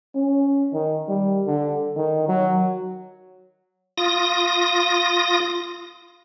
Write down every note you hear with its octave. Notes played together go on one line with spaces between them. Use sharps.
C#4
D#3
G3
D3
D#3
F#3
F4 D#6 A#6